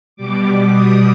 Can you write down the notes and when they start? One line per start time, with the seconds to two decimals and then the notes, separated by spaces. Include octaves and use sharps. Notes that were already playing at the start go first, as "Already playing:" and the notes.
0.16 B2 G3 D6
0.71 D#6